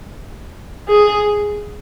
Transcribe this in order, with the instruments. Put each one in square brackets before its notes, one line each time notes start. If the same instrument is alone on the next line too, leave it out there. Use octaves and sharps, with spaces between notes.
[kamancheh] G#4